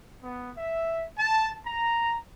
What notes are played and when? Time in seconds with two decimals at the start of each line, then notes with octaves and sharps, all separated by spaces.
0.23 B3
0.57 E5
1.18 A5
1.66 A#5